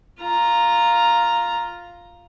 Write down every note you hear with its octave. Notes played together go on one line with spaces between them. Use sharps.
F4 A#5